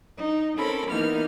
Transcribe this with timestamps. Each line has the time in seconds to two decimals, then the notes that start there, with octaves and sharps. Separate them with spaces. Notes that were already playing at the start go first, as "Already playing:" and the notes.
0.18 D#4
0.57 C4 C#4 A4 A#4 B5
0.89 E3 A#3 B3 D#4 F6